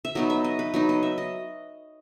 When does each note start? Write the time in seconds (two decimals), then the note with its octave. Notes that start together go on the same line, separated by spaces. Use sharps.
0.05 E5
0.15 F#3 B3 D#4 D#5
0.30 E5
0.44 D#5
0.59 B4
0.74 F#3 B3 D#4
0.89 D#5
1.03 E5
1.18 D#5